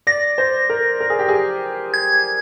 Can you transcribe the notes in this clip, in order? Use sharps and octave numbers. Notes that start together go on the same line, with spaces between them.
D5 A#6
C5
A#4
A#4
G#4
G4
G#4
G#6